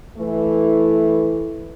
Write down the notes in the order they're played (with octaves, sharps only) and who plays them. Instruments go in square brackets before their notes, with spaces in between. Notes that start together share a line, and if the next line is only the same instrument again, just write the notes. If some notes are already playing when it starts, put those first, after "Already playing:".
[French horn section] E3 A3